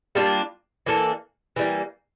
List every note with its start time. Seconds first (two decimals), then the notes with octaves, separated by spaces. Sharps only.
0.15 G3 A#3 D4 F4
0.86 E3 A#3 D4 A4
1.56 E3 G3 A#3